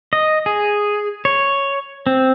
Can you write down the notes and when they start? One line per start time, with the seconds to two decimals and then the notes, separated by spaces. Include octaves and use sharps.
0.13 D#5
0.46 G#4
1.25 C#5
2.06 C4